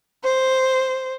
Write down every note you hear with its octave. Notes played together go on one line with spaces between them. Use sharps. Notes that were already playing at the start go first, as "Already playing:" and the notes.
C5